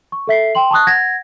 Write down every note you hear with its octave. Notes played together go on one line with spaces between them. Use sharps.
C#6
A4 E5 B6 C7
G5 C6 F#7
A5 C#6 D#6 F#6
F#5 G#6 A#6